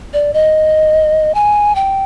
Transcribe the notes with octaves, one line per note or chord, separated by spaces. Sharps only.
D5
D#5
G#5
G5